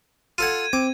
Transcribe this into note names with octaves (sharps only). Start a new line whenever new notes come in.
F4 A4 F#5 G#6 D#7
C4 D6 G#6